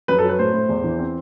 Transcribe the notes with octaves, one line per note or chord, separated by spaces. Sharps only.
F#2 B4
A4
F#3
B4
A2 C5
A2
E2
E3
C4